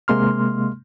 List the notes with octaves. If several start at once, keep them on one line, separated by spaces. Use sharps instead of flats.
C3 G#3 A#3 C6 F6